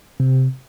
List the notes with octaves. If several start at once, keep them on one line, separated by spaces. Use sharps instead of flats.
C3